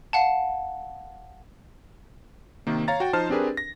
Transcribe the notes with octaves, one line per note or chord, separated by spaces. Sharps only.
F5 F#5 A5
C3 D#3 A#3
C#5 F5 A#5 A6
F#4 G5
F3 D#4 C5 A5 F6
C4 D4 G4 G#4 A#4 B4
A#6